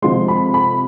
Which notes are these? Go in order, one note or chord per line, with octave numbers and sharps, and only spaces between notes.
C3 F3 G#3 C6
B5
B5